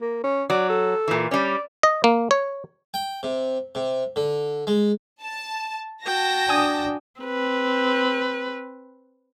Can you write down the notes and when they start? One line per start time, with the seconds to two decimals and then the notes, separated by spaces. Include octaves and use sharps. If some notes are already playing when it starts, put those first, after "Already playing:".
0.01 A#3
0.24 C#4
0.50 F#3 D5
0.70 A4
1.08 A#2 E3
1.31 G3 C#4 D5
1.83 D#5
2.04 A#3
2.31 C#5
2.94 G5
3.23 C3
3.75 C3
4.16 D3
4.67 G#3
5.22 A5
6.04 F#4 G5 A5 A#6
6.49 D4 G#5 D#6
7.21 C4 B4